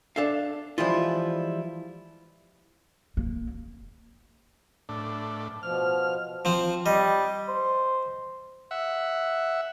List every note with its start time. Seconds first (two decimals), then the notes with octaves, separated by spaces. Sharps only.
0.16 D4 A4 E5 F5
0.78 E3 F3 G3 G#3 E4 F4
3.17 A#3
4.89 A2 D4
5.63 B2 F3 F6
6.45 F3 C4
6.86 G3 D#5
7.49 C5
8.71 E5 F#5